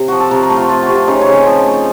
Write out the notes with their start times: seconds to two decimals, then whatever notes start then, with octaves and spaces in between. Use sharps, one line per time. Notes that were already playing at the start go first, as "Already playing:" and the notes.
Already playing: C3
0.08 F3 F#4
0.20 A4
0.31 C3 A#4
0.43 A#4
0.50 A3
0.56 F4
0.69 F3 F4
0.83 F#4
0.89 C3
0.95 F4
1.07 C#3 D#4
1.21 C#4
1.28 C#3
1.34 C4
1.46 F3
1.66 A3